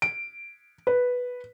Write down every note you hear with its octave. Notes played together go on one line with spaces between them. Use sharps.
D7
B4